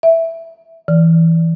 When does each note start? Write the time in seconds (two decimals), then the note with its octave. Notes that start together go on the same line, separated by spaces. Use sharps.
0.03 E5
0.88 E3